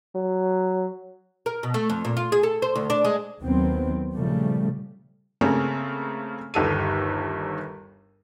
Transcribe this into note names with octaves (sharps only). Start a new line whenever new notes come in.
F#3
A#4
B2
A3
F2
A#2
F4
G#4
A4
C5
D2
D4
G#3
D#2 D#3 F#3 B3 C4
A#2 C#3 F3 G3 A3
C#3 A3 A#3 C4 C#4
G1 D#2 A4 D#7